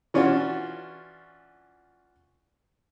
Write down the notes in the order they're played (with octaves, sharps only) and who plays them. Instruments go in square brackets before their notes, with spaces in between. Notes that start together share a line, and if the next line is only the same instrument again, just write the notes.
[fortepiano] E3 C#4 D4 F4 F#4